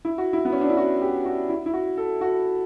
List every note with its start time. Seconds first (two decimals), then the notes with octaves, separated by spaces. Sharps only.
0.05 E4
0.18 F#4
0.33 E4
0.45 B3
0.53 C#4
0.61 D4
0.69 E4
0.77 F#4
1.01 G4
1.25 F#4
1.49 E4
1.66 E4
1.73 F#4
1.97 A4
2.21 F#4